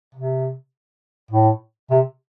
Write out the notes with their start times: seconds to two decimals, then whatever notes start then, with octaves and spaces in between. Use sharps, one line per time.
0.15 C3
1.31 A2
1.90 C3